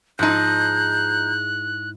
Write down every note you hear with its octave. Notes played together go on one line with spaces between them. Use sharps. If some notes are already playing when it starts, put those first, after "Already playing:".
G#2 F3 D#4 E4 A5 F#6 G6